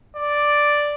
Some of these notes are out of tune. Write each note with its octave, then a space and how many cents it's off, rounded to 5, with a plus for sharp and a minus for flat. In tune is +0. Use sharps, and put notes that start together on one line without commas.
D5 +0